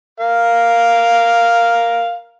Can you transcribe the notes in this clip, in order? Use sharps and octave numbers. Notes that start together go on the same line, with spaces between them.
A#4 F5